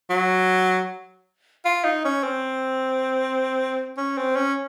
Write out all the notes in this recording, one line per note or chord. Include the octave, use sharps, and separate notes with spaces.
F#3
F4
D#4
C#4
C4
C#4
C4
C#4